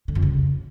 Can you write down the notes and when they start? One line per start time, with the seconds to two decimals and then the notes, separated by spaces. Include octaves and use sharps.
0.08 D3
0.15 F2
0.22 C#3